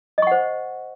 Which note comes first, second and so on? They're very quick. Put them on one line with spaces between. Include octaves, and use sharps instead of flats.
D#5 C#6 F#5 C5